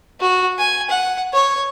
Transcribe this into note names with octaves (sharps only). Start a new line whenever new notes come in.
F#4
G#5
F#5
C#5